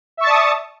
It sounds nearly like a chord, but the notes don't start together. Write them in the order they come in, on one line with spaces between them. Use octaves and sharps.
E5 C#6 A5 D5 D#6